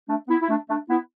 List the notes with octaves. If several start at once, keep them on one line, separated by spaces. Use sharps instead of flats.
A3 D4
B3 E4
E4
A3 D4
A3 D4
B3 E4